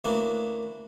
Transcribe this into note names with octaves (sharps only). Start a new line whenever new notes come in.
D2 E3 A#3 C#4 D4